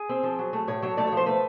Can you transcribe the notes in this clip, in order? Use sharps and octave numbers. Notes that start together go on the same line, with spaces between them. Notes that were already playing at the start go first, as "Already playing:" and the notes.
Already playing: G#4
C4
F3
F#3
A3
A2 C#5
F#3 C#5
A3 D5
C#5
F3
C5
A3 B4